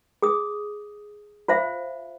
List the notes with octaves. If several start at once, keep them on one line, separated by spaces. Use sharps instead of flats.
G#4 D#6
F4 C5 E5 F5